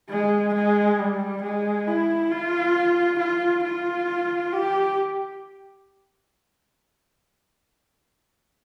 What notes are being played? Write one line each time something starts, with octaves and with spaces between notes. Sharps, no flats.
G#3
G#3
G3
G#3
E4
F4
F4
F4
G4